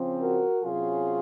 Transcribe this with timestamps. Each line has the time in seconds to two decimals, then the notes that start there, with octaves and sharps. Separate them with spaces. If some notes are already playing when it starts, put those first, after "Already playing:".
Already playing: C#3 F3 C4
0.20 F#4 A#4
0.62 C3 F#3 C#4 F4 G#4